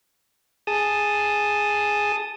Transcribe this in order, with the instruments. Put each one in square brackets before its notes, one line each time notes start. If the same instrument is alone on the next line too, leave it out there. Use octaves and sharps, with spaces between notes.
[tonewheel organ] G#4 A5 D#6